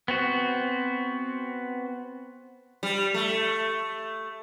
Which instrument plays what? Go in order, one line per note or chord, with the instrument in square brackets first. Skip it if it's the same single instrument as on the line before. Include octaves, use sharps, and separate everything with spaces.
[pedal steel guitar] B3 C4 F#4
[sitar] G3
A3